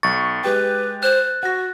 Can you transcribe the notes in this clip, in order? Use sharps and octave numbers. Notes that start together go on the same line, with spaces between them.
B1 C#6 A6
G#3 G4 B4 G5
C5 F#6
F#4 F#5 A#6